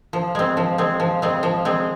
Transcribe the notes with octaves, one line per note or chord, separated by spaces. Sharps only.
F3
G#3 C4
F3
G#3 C4
F3
G#3 C4
F3
G#3 C4